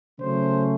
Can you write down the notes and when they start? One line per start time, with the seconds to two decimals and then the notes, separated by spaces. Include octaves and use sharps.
0.19 C#3 F#3 A3 C#4 C5